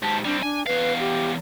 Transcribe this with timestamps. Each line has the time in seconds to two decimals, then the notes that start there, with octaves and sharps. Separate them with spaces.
0.03 G#2 G4 A5
0.25 G3 C4 D4
0.43 D4 G#5
0.67 E2 B4 F5
1.00 G4